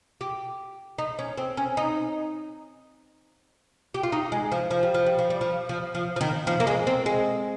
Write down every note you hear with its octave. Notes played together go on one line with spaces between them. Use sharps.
G4
D#4
C#4
C4
C#4
D#4
G4
F4
D#4
G#3
F3
F3
G3
F3
G3
F3
G3
F3
F3
F3
F3
D#3
F3
A#3
G#3
C4
G#3